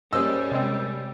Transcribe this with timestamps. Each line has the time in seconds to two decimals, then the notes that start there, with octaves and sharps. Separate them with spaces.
0.13 G3 A#3 C#4 G#4 C5 D#5 E6
0.51 C3 G#3 C4